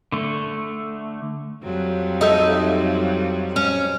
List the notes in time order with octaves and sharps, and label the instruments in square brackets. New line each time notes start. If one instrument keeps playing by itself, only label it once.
[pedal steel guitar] D3 A3
[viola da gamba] F2 F#3 G3
[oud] D#4 A4 E5
C#4